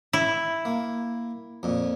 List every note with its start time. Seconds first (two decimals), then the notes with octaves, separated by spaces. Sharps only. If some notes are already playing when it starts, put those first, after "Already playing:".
0.13 E4
0.65 A#3
1.63 F2 A#2